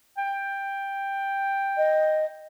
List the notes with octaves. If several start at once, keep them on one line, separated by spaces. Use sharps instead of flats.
G5
D#5